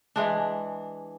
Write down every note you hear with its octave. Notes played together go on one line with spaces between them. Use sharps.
E3 G#3 D4